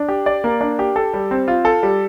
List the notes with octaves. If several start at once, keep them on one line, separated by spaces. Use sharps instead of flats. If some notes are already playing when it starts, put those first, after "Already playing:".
Already playing: D4
G4
D5
A#3
D4
G4
A4
G3
C4
F4
A4
G3